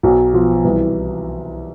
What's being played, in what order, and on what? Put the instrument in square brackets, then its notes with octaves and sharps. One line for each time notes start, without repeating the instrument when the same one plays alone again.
[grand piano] B1 F#3
B2 F3
C2 E3